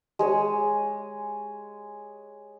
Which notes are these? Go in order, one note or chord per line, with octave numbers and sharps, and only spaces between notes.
G#3 G#4 C#5